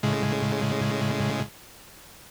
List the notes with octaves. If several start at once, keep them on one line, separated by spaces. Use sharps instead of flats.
A2 C#3 G#3